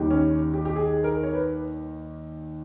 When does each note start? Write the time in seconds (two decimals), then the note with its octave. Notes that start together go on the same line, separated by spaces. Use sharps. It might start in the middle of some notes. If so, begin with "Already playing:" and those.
Already playing: D#2 D#3 G3
0.11 C#4
0.54 G4
0.65 G4
0.76 G#4
1.04 A#4
1.23 C#5
1.34 B4